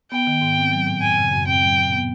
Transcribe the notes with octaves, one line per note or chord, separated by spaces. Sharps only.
B3 G5
D#3
G#2
C4
F#3
A2
F#2 G#5
C#3
F#2
C4 G5
F#3
A#2
B3